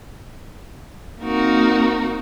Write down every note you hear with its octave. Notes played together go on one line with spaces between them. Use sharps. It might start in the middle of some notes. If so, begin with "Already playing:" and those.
A#3 C4 D#4 F#4 A#4